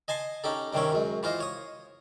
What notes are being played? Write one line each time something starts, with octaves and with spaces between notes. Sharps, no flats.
D#5 G#5 A5 C6
C#4 D#4 G4 A4
G2 C3 D#3 C4 C#4 C#5
F#2 G#3
E3 F4 C5 D#5
C#5 D#6